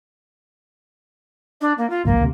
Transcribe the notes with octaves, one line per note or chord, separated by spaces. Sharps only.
D4
A#3
F4
G#1 C#2 F#2 A#3
D2 G#2 C3